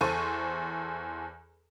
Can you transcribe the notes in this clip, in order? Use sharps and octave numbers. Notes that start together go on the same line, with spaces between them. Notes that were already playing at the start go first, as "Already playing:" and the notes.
E2 A4 C5 C#6 D#7